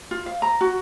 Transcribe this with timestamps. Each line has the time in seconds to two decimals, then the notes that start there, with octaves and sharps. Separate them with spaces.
0.11 F4
0.26 F5
0.42 A#5
0.61 F#4